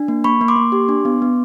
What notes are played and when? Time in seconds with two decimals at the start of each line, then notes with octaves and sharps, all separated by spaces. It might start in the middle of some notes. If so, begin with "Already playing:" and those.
Already playing: D4
0.08 A#3
0.24 A#3 B5 C#6
0.41 A#3
0.48 C6 D6
0.56 A#3
0.72 G4
0.89 D4
1.05 B3
1.22 B3